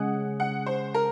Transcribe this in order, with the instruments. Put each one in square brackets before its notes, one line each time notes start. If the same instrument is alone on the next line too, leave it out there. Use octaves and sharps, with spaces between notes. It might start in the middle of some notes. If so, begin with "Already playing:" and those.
Already playing: [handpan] C#3 G#3 C#4 G#4 [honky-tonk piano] F#5
[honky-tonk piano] F#5
C5
A#4